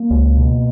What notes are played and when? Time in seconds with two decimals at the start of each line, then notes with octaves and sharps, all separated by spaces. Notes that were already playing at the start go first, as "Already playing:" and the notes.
Already playing: A#3
0.10 C#2
0.37 B2